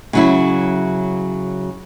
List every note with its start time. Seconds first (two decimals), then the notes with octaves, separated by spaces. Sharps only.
0.13 C#3 F#3 E4